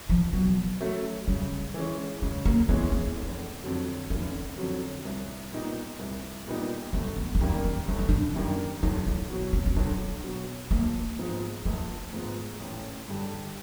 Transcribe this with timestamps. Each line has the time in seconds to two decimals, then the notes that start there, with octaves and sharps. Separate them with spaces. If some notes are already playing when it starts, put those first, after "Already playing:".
0.10 F3
0.33 B2 F#3
0.81 F#3 A3 C#4
1.27 C#3 G3
1.74 E3 G#3 C#4
2.22 C#3 G#3
2.45 A#3
2.69 E3 G#3 B3 C#4
2.92 C4
3.16 F1
3.64 F2 D3 F#3
4.10 F1 C#4
4.58 F2 D3 F#3
5.05 C2
5.52 A#2 G3 B3 D#4
5.99 C2
6.47 A#2 G3 B3 D#4
6.93 G1 C4
7.17 B3
7.35 C#4
7.41 F#2 D#3 G3 A#3 C4
7.64 C#4
7.88 G1 D4
7.99 C#4
8.09 D4
8.35 F#2 D#3 G3 A#3
8.83 B1 D#4
9.07 E4
9.30 B2 F#3
9.53 C#4
9.66 C#4
9.76 B1 D4
10.24 B2 F#3
10.71 A#1 A#3
11.19 G#2 F3 G#3 B3
11.65 A#1 A3
12.13 G#2 F3 G#3 B3
12.60 A1
13.08 G2 D3 G3